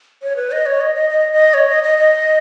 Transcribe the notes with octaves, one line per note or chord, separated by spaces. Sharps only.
C#5
B4
D#5
C#5
D#5
D#5
D#5
D#5
C#5
D#5
D#5
D#5